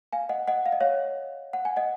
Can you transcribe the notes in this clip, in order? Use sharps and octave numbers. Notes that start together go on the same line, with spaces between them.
F5 G#5
D#5 F#5
D#5 F#5
F5
D#5
C#5 F5
F#5
G#5
D#5 F#5